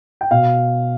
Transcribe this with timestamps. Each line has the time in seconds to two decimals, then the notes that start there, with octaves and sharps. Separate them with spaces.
0.21 G5
0.31 B2 F5